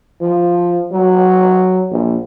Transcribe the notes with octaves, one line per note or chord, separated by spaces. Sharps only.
F3
F#3
A#1